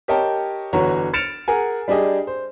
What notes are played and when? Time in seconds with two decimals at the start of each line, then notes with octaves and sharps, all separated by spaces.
0.08 G4 A#4 C#5 D#5 G5 A5
0.73 G1 E3 F#4 C#5 A#5
1.13 F6 A6 C#7 D7 E7 F7
1.48 G#4 A#4 F#5 G#5
1.88 G3 D4 G4 G#4 D#5
2.27 C5